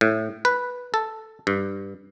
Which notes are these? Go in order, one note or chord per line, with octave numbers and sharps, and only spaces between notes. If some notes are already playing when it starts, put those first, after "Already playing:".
A2
B4
A4
G2